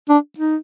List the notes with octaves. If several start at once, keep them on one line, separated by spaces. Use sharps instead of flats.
D4
D#4